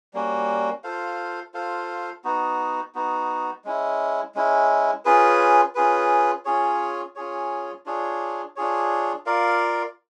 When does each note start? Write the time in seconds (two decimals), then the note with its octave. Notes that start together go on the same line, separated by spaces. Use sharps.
0.14 G3 A#3 C#4 F#4
0.84 F4 A4 C5 F5
1.54 F4 A4 C5 F5
2.24 B3 D#4 F#4
2.95 B3 D#4 F#4
3.65 G#3 C#4 E4
4.35 G#3 C#4 E4
5.05 C#4 F4 G#4 B4
5.75 C#4 F4 G#4 B4
6.45 C#4 F4 G#4 C#5
7.16 C#4 F4 G#4 C#5
7.86 D4 F4 G#4 C#5
8.56 D4 F4 G#4 C#5
9.26 F4 A#4 D5 F5